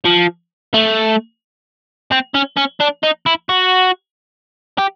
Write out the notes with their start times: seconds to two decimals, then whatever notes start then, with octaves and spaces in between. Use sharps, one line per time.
0.05 F3
0.74 A3
2.12 C4
2.35 C#4
2.57 C#4
2.80 D4
3.03 D#4
3.26 E4
3.49 F#4
4.78 G4